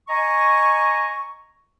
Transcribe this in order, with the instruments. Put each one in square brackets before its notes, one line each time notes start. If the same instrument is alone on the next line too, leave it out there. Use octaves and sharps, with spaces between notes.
[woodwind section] D#5 G#5 A#5 C#6